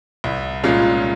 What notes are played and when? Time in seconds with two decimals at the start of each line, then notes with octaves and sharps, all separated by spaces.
0.24 C2
0.63 A#2 G#3 C#4 F4